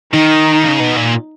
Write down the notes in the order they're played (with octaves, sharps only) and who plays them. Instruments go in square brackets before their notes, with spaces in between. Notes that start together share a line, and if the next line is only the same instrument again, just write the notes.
[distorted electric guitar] D#3 [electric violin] D#4
[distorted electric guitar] C#3
B2
A#2